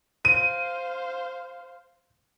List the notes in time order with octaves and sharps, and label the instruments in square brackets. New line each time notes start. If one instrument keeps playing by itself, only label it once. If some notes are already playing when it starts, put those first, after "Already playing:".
[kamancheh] C5 F5 [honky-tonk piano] D#7